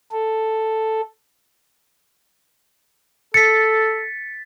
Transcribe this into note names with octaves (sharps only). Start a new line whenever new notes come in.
A4
A4 A6 B6 C#7